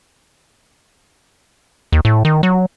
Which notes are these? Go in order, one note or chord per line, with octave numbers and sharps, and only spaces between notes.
D#2
A2
D#3
F#3